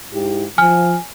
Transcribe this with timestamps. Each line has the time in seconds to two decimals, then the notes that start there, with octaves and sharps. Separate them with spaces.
0.12 G#2 E4 G4
0.58 F3 G#5 F6